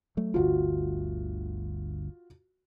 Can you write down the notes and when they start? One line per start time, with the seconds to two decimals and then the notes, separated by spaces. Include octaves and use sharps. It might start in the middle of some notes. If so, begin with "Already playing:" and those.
0.17 F#3 A3
0.34 G1 D2 F4 F#4